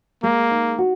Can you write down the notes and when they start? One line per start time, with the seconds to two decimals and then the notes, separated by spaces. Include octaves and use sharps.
0.23 G#3 A#3
0.51 D#4
0.78 F#4